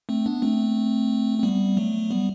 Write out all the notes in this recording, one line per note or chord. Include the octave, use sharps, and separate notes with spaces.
A3 C4
B3 D4
A3 C4
C4
G3 B3
F#3 A3
G3 B3